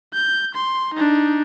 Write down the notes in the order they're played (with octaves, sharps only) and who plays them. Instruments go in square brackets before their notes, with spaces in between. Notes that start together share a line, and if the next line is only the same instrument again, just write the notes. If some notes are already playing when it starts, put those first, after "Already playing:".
[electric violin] G6
C6
D4 D#4